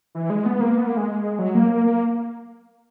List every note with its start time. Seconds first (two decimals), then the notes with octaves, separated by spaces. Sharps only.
0.15 E3
0.30 G#3
0.46 B3
0.61 A#3
0.77 B3
0.87 A#3
0.97 G#3
1.39 F#3
1.55 A#3
1.71 A#3
1.86 A#3